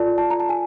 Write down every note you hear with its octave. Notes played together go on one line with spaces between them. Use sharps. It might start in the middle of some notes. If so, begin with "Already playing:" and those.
Already playing: F4 A4 D5 A5
A5
A#5
A5
G#5